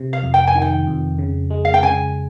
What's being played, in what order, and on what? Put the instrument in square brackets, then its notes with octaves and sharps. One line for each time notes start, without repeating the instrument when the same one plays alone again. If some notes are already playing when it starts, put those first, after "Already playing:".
Already playing: [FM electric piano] C3
[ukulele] F5
[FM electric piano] F2
[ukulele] G5
G#5
[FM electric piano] D#3
[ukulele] G5
[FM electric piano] F2
C#3
G#3
[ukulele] F5
G5
[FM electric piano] C#3 [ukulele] G#5